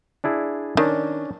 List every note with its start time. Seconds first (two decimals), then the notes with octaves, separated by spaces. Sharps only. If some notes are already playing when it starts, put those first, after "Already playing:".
0.24 D4 E4 G#4
0.77 D#3 C#4 D4